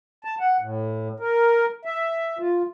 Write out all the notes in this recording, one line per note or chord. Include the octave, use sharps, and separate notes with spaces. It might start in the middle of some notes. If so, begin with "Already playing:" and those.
A5
F#5
A2
A#4
E5
F4